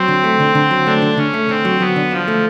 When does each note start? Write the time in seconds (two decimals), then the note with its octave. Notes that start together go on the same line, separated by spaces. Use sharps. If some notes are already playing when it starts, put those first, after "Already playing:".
Already playing: F#3 C4
0.08 D3
0.24 A3
0.40 D3
0.55 D3
0.71 F#3
0.86 A3 D4
1.02 D3
1.18 D3 C#4
1.34 A3
1.49 D3 C4
1.65 F#3
1.80 F#3 B3
1.96 D3
2.11 F3 D4
2.28 A3